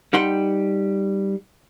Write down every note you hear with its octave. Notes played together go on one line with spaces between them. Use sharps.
G3 D#4 F#5 G5 C6